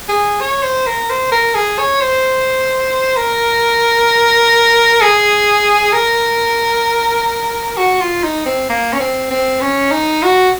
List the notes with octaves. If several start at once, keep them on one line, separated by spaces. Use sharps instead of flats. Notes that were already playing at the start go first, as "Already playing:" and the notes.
G#4
C#5
C5
A#4
C5
A#4
G#4
C#5
C5
A#4
G#4
A#4
F#4
F4
D#4
C4
A#3
C#4
C4
C4
C#4
D#4
F#4